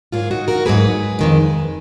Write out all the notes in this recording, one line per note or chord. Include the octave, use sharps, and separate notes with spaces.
G#2 F#3 A#3 F4 G#4
D#4 F#4
F#4 A#4
G#2 F#3 A#3 G#4 B4
F2 D#3 G#3